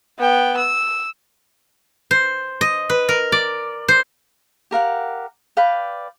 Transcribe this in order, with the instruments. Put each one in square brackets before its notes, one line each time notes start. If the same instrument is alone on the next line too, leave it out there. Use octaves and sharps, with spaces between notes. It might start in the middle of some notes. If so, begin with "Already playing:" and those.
[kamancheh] B3 G5
E6
[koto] C5
D#5
B4
A#4
D5
C5
[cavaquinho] G4 A#4 F5 F#5
B4 D5 F5 G5